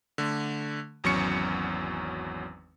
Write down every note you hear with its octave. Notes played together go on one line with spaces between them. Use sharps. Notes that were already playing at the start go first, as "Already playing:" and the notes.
D3 A3
G#1 E2 F#3 C#4 C#6 C#7